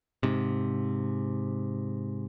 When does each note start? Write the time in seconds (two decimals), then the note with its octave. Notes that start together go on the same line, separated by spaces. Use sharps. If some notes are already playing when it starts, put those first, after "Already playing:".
0.23 G#2 C3